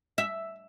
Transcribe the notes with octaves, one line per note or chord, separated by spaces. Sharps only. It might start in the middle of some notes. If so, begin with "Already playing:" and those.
E5